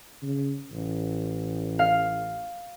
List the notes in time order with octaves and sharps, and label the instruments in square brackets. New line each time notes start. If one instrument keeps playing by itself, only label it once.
[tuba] C#3
A1
[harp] F5